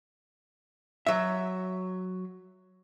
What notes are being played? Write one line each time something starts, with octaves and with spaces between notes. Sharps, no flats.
F#3 E5